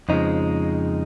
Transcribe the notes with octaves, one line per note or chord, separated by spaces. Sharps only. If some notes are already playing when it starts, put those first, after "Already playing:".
F2 C#3 F3 G#3 D#4